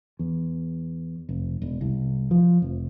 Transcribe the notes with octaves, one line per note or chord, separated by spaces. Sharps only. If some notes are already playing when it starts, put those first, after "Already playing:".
E2
F1
E1
C2
F3
F1